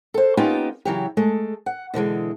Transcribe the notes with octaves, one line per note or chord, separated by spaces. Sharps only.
A4 C5
A#3 B3 C#4 D#4 F4 G4
C#3 E3 F#3 G4
G#3 A3 A4
F#5
B2 D3 E3 G#3